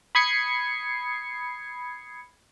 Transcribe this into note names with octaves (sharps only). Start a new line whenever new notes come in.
B5 D#6 G#6 C7 C#7